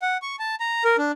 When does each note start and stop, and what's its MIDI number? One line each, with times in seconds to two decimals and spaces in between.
0.02 0.17 78
0.22 0.36 85
0.39 0.55 81
0.60 0.84 82
0.85 0.96 70
0.98 1.12 62